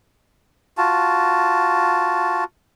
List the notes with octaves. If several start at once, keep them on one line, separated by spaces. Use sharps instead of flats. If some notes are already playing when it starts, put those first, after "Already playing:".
F4 F#4 A5